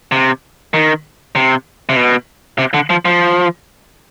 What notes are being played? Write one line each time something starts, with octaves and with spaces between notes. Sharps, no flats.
C3
D#3
C3
C3
B2
C3
D3
F3
F3